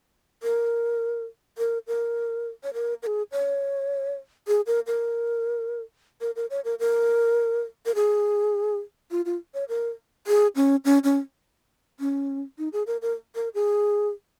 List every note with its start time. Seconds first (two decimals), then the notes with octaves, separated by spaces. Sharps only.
0.43 A#4
1.58 A#4
1.87 A#4
2.63 C#5
2.74 A#4
3.03 A#4
3.07 G#4
3.32 C#5
4.48 G#4
4.67 A#4
4.87 A#4
6.21 A#4
6.36 A#4
6.50 C#5
6.65 A#4
6.80 A#4
7.86 A#4
7.95 G#4
9.11 F4
9.25 F4
9.54 C#5
9.69 A#4
10.27 G#4
10.56 C#4
10.85 C#4
11.04 C#4
12.00 C#4
12.58 D#4
12.73 G#4
12.87 A#4
13.02 A#4
13.35 A#4
13.54 G#4